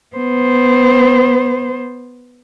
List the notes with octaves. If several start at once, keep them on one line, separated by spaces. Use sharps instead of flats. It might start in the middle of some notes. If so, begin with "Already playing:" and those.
B3 C5